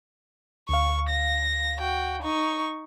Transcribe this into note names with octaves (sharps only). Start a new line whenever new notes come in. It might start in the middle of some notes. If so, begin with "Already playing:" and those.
D2 F5 C#6
A#6
F#4 G5
D#4 C#6